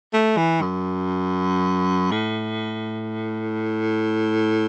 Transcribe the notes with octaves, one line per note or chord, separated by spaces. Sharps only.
A3
E3
F#2
A2